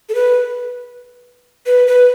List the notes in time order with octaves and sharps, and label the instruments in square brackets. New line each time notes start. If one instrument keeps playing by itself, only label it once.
[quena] A4
B4
B4
B4